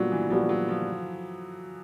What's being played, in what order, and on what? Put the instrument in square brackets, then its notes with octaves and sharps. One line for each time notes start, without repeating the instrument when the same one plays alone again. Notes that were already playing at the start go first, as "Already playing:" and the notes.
Already playing: [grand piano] A#2 G3 B3 D4 F#4 [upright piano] F#3
[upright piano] E3
[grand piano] A#2 G3 B3 D4 F#4 [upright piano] F3
[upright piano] F#3
F3